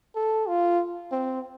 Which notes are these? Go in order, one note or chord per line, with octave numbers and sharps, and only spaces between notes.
A4
F4
C4